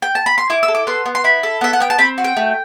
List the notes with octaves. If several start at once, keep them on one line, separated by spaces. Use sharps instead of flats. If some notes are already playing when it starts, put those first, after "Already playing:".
G5
A5
B5
C6
E4 D6
E6
A4
D6
B3 C6
B3
C6
E4 B5
A4
B3 E5
F#5
B3 G5
A5
C4 B5
F#4
G5
A3